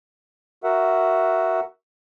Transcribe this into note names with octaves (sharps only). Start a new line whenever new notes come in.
F#4 A#4 E5 F#5